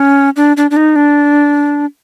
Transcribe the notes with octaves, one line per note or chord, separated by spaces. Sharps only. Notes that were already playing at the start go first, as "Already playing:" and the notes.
Already playing: C#4
D4
D4
D4
D#4
D4